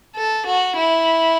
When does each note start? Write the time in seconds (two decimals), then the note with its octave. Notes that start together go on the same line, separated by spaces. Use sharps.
0.15 A4
0.46 F#4
0.77 E4